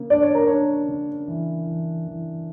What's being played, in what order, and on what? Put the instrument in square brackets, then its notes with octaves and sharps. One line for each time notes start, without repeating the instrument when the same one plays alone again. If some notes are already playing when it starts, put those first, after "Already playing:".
Already playing: [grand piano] C#3 A#3
[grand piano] D4 [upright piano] D5
[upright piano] C#5
A#4
[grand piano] D4 [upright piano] C#5
[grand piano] C#3
E3
E3
E3